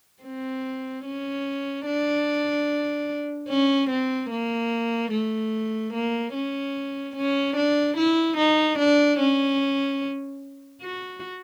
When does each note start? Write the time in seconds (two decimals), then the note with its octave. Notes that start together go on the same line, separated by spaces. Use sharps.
0.23 C4
1.05 C#4
1.86 D4
3.49 C#4
3.90 C4
4.30 A#3
5.12 A3
5.93 A#3
6.34 C#4
7.16 C#4
7.56 D4
7.97 E4
8.37 D#4
8.78 D4
9.20 C#4
10.82 F#4